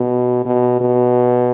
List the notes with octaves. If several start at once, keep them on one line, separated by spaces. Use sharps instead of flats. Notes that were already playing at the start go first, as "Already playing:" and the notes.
Already playing: B2
B2
B2